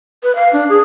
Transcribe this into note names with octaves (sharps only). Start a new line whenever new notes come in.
B4
F5
D4
G#4